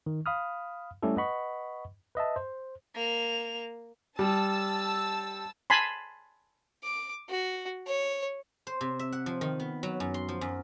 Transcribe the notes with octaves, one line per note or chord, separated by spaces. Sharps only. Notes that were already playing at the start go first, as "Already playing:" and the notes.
D#3
F5 B5 D#6 F6
G3 A3 C#4 E4 G4 A4
B4 D#5 F#5 B5 C#6
B4 D#5 E5 A5
C5
A#3 F7
G3 A5 E6
G#5 A5 B5 C6
D6
F#4
C#5
C5
C3
E5
F#5
F3
D#3
B3
F#3
F#2
C6
F3
F#2